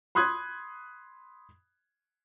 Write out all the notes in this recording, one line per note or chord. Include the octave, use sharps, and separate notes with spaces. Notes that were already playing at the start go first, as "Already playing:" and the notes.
B5 C6 D#6 F#6 G#6